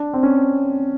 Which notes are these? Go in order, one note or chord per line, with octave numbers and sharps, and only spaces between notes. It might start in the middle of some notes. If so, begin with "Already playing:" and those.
Already playing: D4
C4
C#4